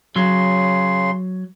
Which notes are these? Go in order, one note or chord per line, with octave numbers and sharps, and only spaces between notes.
C#3 F#3 C6